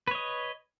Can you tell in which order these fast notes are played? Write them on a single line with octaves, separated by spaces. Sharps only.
B4 C#5 D#5